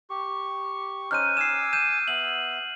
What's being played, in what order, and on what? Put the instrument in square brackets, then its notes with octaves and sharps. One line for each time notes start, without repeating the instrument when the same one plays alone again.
[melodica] G4 C#6
[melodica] C#4 D#4 C5 [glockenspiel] F6 F#6 D#7
[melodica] G#5 D6 E6 [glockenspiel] C7 E7
[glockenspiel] G6 D#7 E7
[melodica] B3 E5 [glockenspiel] F#7